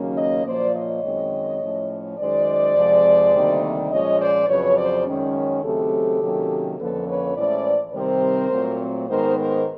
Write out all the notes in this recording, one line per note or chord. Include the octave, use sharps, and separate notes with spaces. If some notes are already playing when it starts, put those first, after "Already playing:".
Already playing: D#2 C#3 F#3 A#3 C#4
C#5 D#5
A#2 F3 A#3 C5 D5
C#5 D#5
F#2 D#3 G#3 C4
A2 F3 A3 C#4
F#2 D#3 G#3 C5 D5
F2 C3 F3 G#3
D2 C3 D#3 G3 A#3
A#2 F3 G#3 C#4 C#5 D#5
C5 D5
F2 C#3 F#3 B4 C#5
C5 D5
F#2 D#3 G#3 C#4
D#2 C#3 F#3 A3 C4 G4 A4
C3 D#3 F#3 A#3 C#4
F2 D3 F3 A#3 C#4 A4 B4
B4 C#5
A2 E3 G#3 C#4 C5 D5
C3 D#3 G3 C4 A#4 C5
A#2 F#3 A3 C4
G#2 D#3 G#3 B3 A#4 C5
A#4 C5